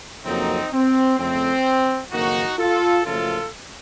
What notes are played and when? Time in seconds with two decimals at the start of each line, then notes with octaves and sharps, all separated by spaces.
0.24 F2 C#3 F#3 A#3 C4 D#4
0.71 C4
1.17 F2 C#3 A3 C4
2.11 F#1 F2 D#3 A#3 D#4 F#4
2.58 F4 A4
3.05 F#1 F#2 F3 A3 F4 A4